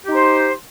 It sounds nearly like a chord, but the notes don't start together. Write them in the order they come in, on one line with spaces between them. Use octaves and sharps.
G4 D#4 C5